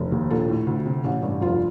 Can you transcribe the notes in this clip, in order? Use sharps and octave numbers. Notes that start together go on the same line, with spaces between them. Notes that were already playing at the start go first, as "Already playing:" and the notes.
Already playing: F1
D#2
A#1 A4
A2
D2
C3
A1
G2
F1 F4